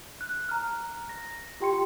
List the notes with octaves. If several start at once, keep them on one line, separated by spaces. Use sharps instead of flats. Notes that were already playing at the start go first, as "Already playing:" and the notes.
F#6
A#5 F6
A#6
F4 G4 G5 C6 C#7